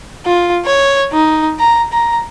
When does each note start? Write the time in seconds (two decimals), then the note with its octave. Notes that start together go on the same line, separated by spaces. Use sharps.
0.26 F4
0.66 C#5
1.12 D#4
1.60 A#5
1.92 A#5